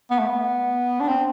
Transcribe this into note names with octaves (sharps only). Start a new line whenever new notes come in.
B3
A3
B3
D4
C4